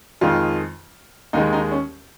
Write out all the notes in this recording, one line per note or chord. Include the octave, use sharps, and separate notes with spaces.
F2 D#3 G#3 F4
D#2 D#3 G#3 D#4
D#4
C#4